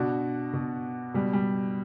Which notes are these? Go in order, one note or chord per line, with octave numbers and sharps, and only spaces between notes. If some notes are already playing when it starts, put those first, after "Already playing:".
Already playing: B2 D4 F#4
B2
B2 G3
G3